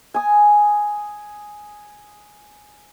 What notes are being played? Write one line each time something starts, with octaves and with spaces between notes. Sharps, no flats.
G#5 D#6